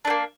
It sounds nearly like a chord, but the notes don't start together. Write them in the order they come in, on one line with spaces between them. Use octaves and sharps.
D4 A3 A#3